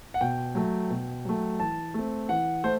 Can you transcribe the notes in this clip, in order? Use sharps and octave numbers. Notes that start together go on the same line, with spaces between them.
F#5
B2 G5
F#3 A3
B2
F#3 A3
E3 A5
A3 C4
E3 F#5
A3 C5